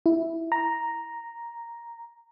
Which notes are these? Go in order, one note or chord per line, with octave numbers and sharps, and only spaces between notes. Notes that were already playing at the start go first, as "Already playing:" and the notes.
E4
A#5